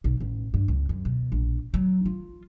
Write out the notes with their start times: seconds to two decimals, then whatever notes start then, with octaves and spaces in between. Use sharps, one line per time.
0.04 B1
0.20 A1
0.54 G2
0.68 C#2
0.89 F#2
1.05 B2
1.32 A#1
1.74 F#3
2.06 F4